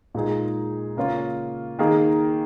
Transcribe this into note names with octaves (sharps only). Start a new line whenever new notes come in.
A#2 G#3 D#4 G#4
C#3 A#3 C#4 F4
D#3 A#3 D#4 G#4